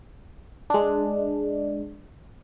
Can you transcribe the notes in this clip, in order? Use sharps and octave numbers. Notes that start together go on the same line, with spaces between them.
G#3 D4